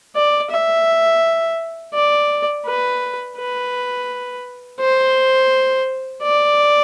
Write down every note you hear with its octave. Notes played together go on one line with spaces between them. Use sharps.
D5
E5
D5
B4
B4
C5
D5